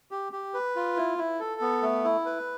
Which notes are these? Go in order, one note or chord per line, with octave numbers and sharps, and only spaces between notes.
G4
G4
B4
F4
E4
E4
A4
B3
A3
E4
B4